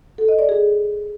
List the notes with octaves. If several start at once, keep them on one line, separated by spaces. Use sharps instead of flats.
A4
D#5
D5
G#4